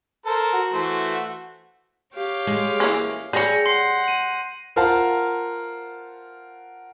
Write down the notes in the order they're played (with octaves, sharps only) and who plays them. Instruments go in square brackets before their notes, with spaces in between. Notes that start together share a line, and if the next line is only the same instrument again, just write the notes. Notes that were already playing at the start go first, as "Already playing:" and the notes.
[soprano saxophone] A4 [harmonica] A#4 C5
[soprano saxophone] F#4
[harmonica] E3 A3 C5
[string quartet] G4 C#5 F5
[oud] G#3
[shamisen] E3 A#3 C#4
[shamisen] G3 C#4 [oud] G#4 [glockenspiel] G6 A#6 C#7
[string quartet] F#5 [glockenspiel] C6 C7
[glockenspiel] D#7 F#7
[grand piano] F4 A#4 C5 F5 F#5 A5